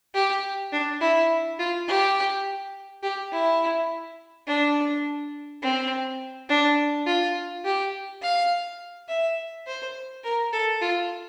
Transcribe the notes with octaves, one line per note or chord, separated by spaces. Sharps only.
G4
D4
E4
F4
G4
G4
E4
D4
C4
D4
F4
G4
F5
E5
C5
A#4
A4
F4